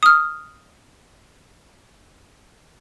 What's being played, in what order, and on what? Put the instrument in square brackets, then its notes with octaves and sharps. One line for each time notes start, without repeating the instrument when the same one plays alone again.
[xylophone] D#6 F6